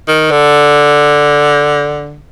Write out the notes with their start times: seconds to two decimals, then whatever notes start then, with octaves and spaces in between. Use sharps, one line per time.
0.08 D#3
0.31 D3